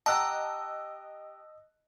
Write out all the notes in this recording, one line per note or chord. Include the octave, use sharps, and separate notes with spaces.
G4 D#5 F#5 A5 A#5 E6 F#6